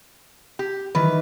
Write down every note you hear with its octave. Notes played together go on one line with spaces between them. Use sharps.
G4
D#3 E3 B4